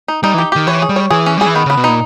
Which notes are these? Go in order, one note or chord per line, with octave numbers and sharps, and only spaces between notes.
D#4
G3 D#4
E3
G4
D#3 G4
E3 C#5
G#4
G3
C#5
E3 G#4
C#4
G3 G#4
E3
D#3 B3
C#3
B3
B2
A#2 D#4